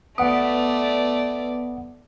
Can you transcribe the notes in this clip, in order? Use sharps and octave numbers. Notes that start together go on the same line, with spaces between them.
G#1 A3 B3 B4 D5 F#5 D#6